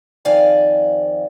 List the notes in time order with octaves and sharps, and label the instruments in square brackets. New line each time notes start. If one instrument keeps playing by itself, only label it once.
[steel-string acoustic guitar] F2 D#3 F3 D5 F5 G#5